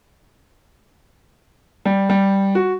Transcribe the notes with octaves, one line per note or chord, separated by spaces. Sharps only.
G3
G3
F#4